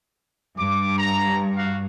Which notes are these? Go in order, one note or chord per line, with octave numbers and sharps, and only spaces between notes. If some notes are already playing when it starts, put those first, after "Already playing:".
G2 D6
A#5
F#4 F5